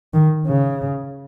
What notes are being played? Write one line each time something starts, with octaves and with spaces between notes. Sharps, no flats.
D#3
C#3